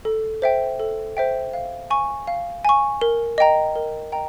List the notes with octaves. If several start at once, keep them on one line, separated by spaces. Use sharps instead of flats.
A4
C5 E5 G5
A4
C5 E5 G5
F5
G#5 C#6
F5
G#5 C#6
A#4
D#5 G5 A#5
A#4
D#5 G5 A#5